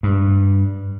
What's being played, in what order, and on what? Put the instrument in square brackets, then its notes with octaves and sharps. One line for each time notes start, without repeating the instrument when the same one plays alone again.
[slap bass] G2